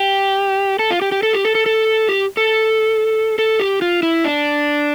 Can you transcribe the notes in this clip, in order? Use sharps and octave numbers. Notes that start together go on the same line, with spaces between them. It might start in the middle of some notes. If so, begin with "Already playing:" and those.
Already playing: G4
A4
F4
G4
G4
A4
G4
A4
A4
A4
G4
A4
A4
G4
F4
E4
D4